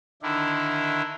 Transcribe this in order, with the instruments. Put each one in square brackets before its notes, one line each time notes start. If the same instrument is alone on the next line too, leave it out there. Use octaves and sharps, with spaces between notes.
[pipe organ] D3 D#3 D4 E4